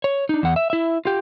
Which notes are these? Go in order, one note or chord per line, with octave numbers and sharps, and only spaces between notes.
C#5
D4 D#4
E2 F#5
E5
E4 E5
F4 G4